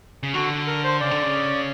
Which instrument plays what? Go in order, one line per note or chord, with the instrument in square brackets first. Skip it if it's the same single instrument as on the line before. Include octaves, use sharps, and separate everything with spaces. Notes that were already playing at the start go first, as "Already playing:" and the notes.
[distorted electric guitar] C#3
[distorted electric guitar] D3 [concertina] F#4
[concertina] A#4
C5
[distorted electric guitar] C#3 [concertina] D5
[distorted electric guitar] D3
C#3